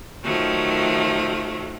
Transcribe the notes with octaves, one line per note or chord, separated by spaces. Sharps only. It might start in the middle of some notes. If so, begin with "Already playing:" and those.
D#3 F3 F#3 A3